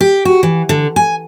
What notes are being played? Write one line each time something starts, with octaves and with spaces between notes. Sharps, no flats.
G4
F#4
E3
D3
G#5